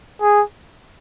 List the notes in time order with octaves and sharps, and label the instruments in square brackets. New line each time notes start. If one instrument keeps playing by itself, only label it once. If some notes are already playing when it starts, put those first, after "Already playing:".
[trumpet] G#4